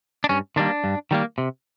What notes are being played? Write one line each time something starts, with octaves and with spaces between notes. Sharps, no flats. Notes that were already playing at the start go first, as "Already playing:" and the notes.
D4
G2 C#4
D#3 G3 A#3 D4
G2
D#3 G3 A#3
C3